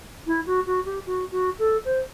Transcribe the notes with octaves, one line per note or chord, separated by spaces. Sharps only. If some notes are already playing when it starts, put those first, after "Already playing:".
E4
F#4
F#4
G4
F#4
F#4
A4
C5